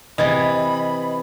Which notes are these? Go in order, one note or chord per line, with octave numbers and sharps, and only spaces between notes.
C3 E3 D#5 B5 G#6 A6